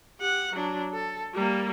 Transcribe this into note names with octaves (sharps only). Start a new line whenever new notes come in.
G4 F#5
F#3 D4
A4
G3 A#3